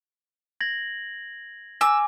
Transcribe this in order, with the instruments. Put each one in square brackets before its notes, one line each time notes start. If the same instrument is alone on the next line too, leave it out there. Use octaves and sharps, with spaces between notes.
[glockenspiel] G#6 A#6 F#7
[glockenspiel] G#5 D6 [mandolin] E6